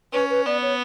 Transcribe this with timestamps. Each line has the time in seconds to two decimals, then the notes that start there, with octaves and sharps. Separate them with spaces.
0.13 C#4 B4
0.30 B4
0.46 B3 D5
0.62 C#5